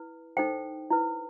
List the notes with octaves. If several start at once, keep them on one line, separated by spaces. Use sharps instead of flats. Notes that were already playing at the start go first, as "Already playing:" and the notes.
Already playing: E4 B4
D#4 A4 C5 G5
E4 B4